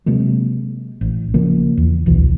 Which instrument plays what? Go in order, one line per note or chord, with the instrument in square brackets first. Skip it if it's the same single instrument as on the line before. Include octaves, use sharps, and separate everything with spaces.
[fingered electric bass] C3 F#3 G#3 A#3
A1
C#3 F3 A#3
E2
D1 A#1 B2 E3